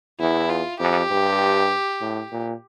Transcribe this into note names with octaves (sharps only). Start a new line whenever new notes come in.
E2 E4
F4
F2 G4
G2
A2
A#2